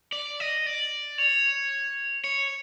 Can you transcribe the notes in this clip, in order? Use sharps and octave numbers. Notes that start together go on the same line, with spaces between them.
D5
D#5
D5
C#5
C#5